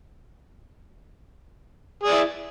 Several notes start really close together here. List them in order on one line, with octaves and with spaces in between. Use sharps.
G#4 D5 E4